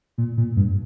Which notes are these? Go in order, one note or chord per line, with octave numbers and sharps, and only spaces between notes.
A#2
A#2
G2